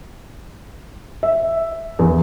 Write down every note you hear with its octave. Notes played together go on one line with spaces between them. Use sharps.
E5
E2